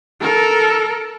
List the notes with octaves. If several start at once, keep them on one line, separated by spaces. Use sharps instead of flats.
A4 A#4